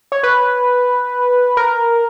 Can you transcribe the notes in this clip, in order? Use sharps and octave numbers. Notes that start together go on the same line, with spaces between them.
C#5
B4
A#4